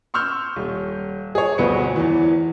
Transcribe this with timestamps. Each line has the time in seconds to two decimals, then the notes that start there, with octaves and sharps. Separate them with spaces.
0.14 C6 C#6 E6 F6 G6
0.56 D#1
1.35 G#4 C#5
1.58 G1 D2 B2 B4 C5 C#7
1.96 E2 E3